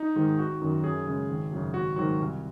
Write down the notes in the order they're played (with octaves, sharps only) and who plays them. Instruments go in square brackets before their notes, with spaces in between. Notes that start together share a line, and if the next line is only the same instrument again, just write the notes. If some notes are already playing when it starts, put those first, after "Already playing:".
Already playing: [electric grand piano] D#4
G#2 D#3 G#3
G#1 F#4
F#2 D#3 F#3
F#2 G#4
C#3 G#3
G#1
F#2 C#3 F#3
G#1 F#4
G#2 D#3 F#3 F#4
C2